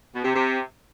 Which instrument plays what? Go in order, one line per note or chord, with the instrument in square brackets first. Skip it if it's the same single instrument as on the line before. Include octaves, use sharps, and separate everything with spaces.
[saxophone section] B2
C3
C3